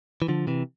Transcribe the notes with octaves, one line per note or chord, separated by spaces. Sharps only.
E3
D3 F3
C3 E3